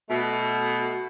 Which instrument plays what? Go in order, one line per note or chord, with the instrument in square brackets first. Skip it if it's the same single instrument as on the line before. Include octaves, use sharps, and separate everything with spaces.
[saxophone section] B2 A3